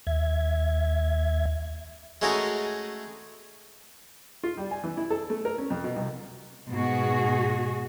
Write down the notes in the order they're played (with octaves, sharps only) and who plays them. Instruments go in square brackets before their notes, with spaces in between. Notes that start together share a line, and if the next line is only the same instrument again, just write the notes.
[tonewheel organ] D#2 E5 G#6
[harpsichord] G#3 A3 C#4 F#4 G#4 A#4
[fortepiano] F4
G3
G#5
E3
E4
A4
A3
A#4
C#4
F2
B2
C2
[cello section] G#2 B2 F#4 G#4